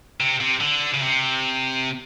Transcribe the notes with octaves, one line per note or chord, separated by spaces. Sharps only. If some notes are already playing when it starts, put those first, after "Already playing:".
C3
C3
D3
C#3
C3